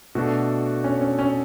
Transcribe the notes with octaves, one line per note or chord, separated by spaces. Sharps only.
B2 A3 D4 F#4 A4
C#4
C#4
C#4